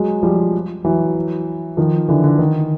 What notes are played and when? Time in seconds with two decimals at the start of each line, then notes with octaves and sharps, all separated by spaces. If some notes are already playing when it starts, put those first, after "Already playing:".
Already playing: F#3 G#3
0.23 F3 G3
0.85 E3 F#3
1.77 D#3 F3
2.08 D3 E3
2.24 D3
2.39 D#3